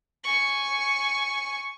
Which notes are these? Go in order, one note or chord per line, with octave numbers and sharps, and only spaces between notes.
G#5 C#6